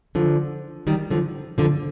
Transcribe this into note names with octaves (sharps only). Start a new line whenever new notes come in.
D3 F3
D#3 G3
D3 F3
D3 F3